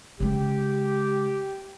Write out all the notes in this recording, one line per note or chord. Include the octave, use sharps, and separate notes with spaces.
C#3 G#3 G4